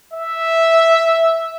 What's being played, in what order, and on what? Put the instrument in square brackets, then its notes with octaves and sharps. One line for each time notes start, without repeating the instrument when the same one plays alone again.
[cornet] E5